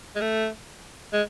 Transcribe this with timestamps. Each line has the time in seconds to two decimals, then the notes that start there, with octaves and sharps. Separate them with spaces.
0.16 G#3
0.21 A3
1.13 G#3